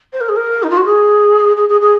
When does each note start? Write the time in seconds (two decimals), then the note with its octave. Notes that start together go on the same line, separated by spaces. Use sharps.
0.13 C5
0.21 A#4
0.29 G#4
0.36 A#4
0.63 D#4
0.70 F4
0.77 F#4
0.85 G#4
1.57 G#4
1.69 G#4
1.81 G#4